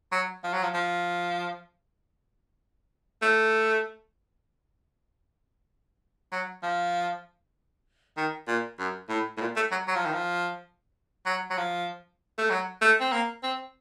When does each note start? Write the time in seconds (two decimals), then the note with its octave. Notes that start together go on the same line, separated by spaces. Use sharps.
0.12 F#3
0.44 F3
0.53 F#3
0.64 F3
0.74 F3
3.22 A3
6.32 F#3
6.63 F3
8.17 D#3
8.48 A#2
8.79 F#2
9.09 A2
9.37 A2
9.41 A#2
9.56 A3
9.72 F#3
9.88 F#3
9.96 F3
10.06 D#3
10.13 F3
11.26 F#3
11.50 F#3
11.58 F3
12.38 A3
12.50 F#3
12.82 A3
13.01 C4
13.13 A#3
13.43 C4